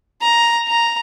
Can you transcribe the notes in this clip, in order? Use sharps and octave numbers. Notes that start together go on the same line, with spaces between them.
A#5
A#5